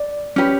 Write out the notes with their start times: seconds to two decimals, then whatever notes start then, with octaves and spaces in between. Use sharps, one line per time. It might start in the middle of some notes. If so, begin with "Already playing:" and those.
Already playing: D5
0.36 C#4 G4 B4